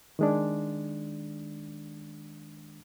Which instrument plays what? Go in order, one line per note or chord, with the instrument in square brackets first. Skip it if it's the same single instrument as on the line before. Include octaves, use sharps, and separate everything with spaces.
[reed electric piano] D#3 G#3 D4